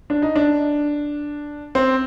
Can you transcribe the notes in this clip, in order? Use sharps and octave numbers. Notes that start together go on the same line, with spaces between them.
D4
D#4
D4
C4